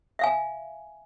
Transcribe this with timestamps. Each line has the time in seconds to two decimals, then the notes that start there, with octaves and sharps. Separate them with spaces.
0.19 E5 F5 G#5